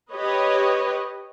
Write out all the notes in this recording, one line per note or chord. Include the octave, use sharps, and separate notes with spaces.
G4 B4 C#5 D#5